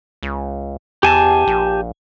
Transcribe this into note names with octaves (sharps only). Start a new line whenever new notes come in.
C#2
E2 G4 G#5 A5
A#1